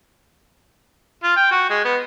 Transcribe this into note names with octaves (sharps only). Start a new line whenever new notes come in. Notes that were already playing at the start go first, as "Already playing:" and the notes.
F4
G5
F#4
G#3
B3